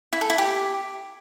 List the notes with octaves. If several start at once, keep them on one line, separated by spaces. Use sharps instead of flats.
E4
A4
E4
G4